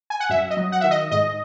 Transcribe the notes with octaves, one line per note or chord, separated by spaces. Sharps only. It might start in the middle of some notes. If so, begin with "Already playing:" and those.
G#5
F#5
F#2 E5
D#5
F#3
F#5
D#3 E5
D#5
G#2 D#5